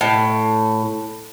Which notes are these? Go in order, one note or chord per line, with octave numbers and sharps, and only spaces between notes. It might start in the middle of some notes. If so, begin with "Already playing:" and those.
A2